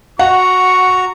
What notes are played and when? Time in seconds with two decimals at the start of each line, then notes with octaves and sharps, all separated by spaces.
0.19 F#4 F#5 A#5 C#6